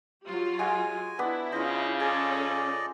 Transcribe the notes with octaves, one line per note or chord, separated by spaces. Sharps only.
F#3 F4 G4
G#3 F#4 G#5
B3 D4 E4 B4
C#3 F4 C5 D#5
C#4 G#4 A4 D5 D#5